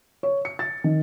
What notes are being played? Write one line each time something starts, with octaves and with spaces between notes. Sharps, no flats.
C#5
C#7
A6
D#3